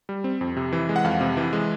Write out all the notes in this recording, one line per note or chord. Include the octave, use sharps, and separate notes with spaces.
G3
C4
F2
C3
E3
G#3
F#5
F2 F5
C3
E3
G#3